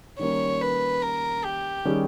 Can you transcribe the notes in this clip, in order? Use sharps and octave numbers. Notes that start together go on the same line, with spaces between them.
D#3 G3 A#3 C#4 C#5
B4
A#4
G4
D#3 G3 C#4 G#4